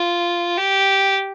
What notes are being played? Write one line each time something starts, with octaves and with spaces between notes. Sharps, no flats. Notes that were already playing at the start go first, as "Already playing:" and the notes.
Already playing: F4
G4